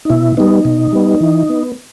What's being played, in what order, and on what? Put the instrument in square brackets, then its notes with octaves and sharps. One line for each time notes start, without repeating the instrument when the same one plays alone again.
[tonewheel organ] D#4
B2 E4
G3 B3 D#4
B2
G3 B3
E3
B3